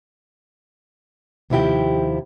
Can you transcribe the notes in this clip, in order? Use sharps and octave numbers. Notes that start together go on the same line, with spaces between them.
D#2 C3 F3 E4 G4 G5